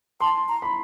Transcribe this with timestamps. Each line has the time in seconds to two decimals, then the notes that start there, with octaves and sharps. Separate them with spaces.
0.20 A5 C6
0.49 A#5
0.62 B5